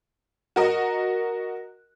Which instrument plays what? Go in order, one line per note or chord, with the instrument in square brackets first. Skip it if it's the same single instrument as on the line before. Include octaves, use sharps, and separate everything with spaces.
[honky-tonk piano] F#4 A#4 D#5